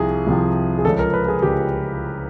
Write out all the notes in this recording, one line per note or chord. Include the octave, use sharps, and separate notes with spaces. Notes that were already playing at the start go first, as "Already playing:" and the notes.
Already playing: C2 C3 F3 G#4
C2 C3 F3
G#4
C#2 C#3 F3 A4
A#4
B4
G#4
C#2 C#3 F3 G4